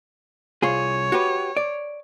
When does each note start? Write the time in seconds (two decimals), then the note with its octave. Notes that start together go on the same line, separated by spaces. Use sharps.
0.62 C2 F4 G#4 C#5
1.12 F#4 G4 B4
1.57 D5